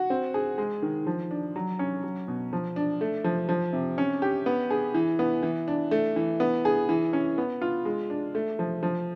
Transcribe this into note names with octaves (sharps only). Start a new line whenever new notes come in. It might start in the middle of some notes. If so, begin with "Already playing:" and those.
Already playing: F#4
C4
G#4
G#3
D#3
F3
D4
F#3
C#4
F#3
B2
F3
D4
A3
F3
F3
C3
C#4
G4
B3
G#4
E3
B3
E3
D4
A3
E3
B3
G#4
E3
C#4
B3
F4
G#3
D4
A3
F3
F3